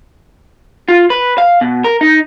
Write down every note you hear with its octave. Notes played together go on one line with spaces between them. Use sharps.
F4
B4
F5
B2
A#4
D#4